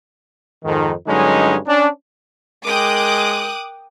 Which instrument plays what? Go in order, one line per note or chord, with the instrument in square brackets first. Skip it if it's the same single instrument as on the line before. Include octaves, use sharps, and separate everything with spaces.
[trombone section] F2 G#2 D#3
G2 D3 F#3 G#3 C#4 D#4
C#4 D4
[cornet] G#3 [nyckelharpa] A#4 G5 [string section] D6 D#6 F#6